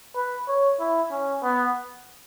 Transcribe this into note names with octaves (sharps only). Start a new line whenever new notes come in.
B4
C#5
E4
C#4
B3